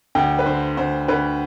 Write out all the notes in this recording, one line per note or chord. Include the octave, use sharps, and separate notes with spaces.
D2 G5
B4
D3 C5
D2 C5
D2 B4